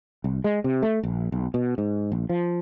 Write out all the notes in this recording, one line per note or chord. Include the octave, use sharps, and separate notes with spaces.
C2
G#3
C3
A3
A#1
B1
B2
G#2
A#1
F3